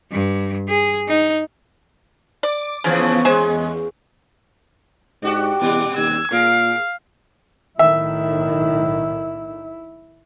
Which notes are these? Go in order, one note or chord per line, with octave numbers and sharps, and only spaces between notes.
G2
G#4
D#4
D5 D6
C#3 E3 F3 B3 C#4
E2 G#3 C5 G#5
G#2 D4 F#4 G4
E2 A#2 G3 D6
D#2 E6 G#6
A#2 G#4 A#4 F5
B1 A2 D#3 E4 E5